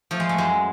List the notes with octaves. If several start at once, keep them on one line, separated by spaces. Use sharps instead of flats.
F3 A3
G#3
A3
F#2 G#3